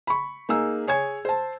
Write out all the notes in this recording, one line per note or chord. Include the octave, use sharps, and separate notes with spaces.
B5 C#6
A#3 D#4 G#4 E6
G#4 C#5 G#5 G#6
C5 A5